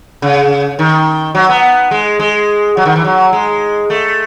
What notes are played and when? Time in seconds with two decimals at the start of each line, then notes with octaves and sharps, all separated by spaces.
0.22 C#3
0.79 D#3
1.35 F#3
1.49 B3
1.91 G#3
2.19 G#3
2.77 F#3
2.85 D#3
2.96 E3
3.04 F#3
3.33 G#3
3.90 A3